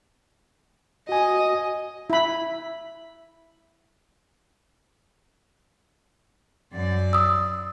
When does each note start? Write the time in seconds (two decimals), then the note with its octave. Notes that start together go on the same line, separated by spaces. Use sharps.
1.09 F#4 D#5 G#5
2.10 E4 B5
6.73 F#2 D5
7.13 D#6 E6